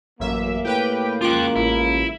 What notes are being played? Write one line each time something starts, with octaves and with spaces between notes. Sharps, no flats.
A1 F#2 A#3 E5
A2 G4 B4 G5
C#2 F4 G5 D6 F#6
A1 E4